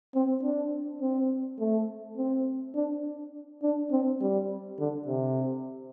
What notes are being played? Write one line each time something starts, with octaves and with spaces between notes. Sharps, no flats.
C4
D4
C4
A3
C4
D4
D4
C4
G3
D3
C3